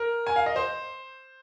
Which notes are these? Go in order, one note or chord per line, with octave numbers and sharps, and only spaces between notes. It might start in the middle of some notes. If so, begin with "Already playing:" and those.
Already playing: A#4
G#5
F5
D#5
C5